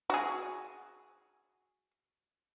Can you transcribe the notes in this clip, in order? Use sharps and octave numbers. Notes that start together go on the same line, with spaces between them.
F#4 G#4